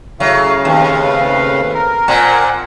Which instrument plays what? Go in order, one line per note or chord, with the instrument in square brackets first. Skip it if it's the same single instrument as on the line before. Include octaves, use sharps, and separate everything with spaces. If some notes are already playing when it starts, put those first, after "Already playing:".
[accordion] C#3 F5 [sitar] F#3 [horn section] A3 E4 E5
[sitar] D#2 [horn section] A3 C4 B4
[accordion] A#4
[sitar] A#2 C4 [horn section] F#5 G#5